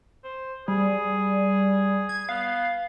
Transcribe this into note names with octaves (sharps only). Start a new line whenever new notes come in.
C5
G3 G#4
G#6
B3 F5